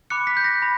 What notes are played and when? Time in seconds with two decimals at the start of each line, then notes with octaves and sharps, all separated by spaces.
0.10 B5 D6 F#6 C#7
0.27 B6
0.37 G6
0.44 A#6
0.62 B5